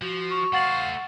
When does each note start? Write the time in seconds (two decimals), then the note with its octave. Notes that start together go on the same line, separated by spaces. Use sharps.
0.02 F3 F#4
0.31 C#6
0.53 A3 C5 F5 F#5 A6 F#7